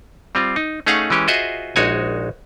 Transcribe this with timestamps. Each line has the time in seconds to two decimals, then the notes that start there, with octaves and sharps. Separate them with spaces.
0.35 G3 C4 F4
0.56 D#4
0.86 A3 C#4 D#4 G#4 F5 F#5
1.10 E3 G#3 C#4 G4
1.28 F4 F#4 G#4 C5 D#5 E5
1.76 A#1 G#3 D#4 F#4 C#5 G#5